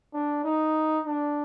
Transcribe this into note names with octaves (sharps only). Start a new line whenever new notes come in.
D4
D#4
D4